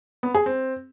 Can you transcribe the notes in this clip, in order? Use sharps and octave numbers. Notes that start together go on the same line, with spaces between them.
B3
G#4
C4